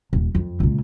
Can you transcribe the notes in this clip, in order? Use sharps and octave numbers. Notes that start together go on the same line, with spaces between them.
D#1
F2
C#2 A#2